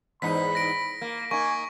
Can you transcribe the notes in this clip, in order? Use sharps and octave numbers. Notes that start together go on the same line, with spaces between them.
E2 G#2 D#4 B5 B6
A#6 D7
A#3
A#3 D#4 G#5 C#6